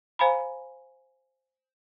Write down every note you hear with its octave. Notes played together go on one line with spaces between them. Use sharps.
C5 F5 G#5 A#5 B5